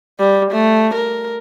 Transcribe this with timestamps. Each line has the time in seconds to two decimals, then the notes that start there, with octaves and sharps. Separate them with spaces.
0.19 G3
0.51 A3
0.94 A#4